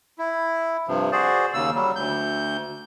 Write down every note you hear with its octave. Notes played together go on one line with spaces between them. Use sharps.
E4
G2 C3 F3
F#4 G#4 C5 D5
D#2 C#3 E6
F#3 G3
D2 G6